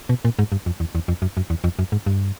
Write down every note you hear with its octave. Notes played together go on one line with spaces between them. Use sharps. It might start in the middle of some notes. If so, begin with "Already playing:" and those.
B2
A#2
G#2
G2
F2
E2
E2
F2
F#2
F#2
E2
F2
F#2
G#2
G2